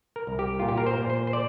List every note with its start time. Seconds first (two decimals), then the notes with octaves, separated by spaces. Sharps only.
0.16 A#4
0.27 C2
0.39 G4
0.59 A#2 F4
0.68 G4
0.78 A#4
0.86 C5
0.98 A#2
1.10 C5
1.27 C5
1.33 D5